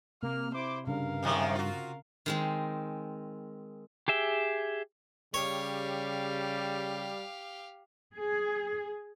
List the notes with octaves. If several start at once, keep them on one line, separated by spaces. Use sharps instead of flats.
C3 A#3 F6
E4 C5 D6
G2 C#3 A#4 F5
F#2 C3 D#3
F4 F#4
D#3 G#3 C4
G4 G#4 E5 G5
C#3 G3 G4 C#5 F5
G#4